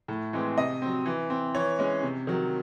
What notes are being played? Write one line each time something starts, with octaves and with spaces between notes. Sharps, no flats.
A2
E3 G#3 C4
C3 D#5
F#3 C4
E3
C4
E3 C#5
G#3 C#4
C3
D#3 F#3